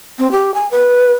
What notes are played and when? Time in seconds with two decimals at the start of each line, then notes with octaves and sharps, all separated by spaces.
0.19 C4
0.32 G4
0.54 G#5
0.71 B4